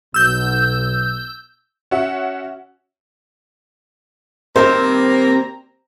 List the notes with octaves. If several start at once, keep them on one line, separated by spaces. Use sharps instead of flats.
B1 B2 E6 G6
C#4 F#4 E5 F#5
C3 D#3 G3 A#3 C4 C5 A#5